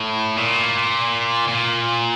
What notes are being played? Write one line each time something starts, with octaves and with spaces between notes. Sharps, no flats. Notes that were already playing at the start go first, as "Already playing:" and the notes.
Already playing: A2
A#2
A#2